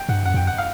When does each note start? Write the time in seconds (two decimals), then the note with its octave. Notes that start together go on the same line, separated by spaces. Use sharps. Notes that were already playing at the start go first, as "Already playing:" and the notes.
Already playing: G5
0.09 G2 F#5
0.25 F#2 F#5
0.34 F2 G5
0.42 F#2
0.47 F#5
0.58 F5